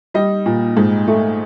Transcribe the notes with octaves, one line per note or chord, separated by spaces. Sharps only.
G3 D#5
A#2
G#2
A3